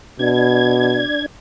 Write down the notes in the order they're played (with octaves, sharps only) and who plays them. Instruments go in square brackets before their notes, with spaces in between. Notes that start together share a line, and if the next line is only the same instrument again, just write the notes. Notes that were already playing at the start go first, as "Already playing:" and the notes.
[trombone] B2 [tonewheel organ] D4 G#6